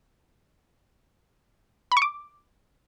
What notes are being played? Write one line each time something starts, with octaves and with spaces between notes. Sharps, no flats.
B5
C#6
D6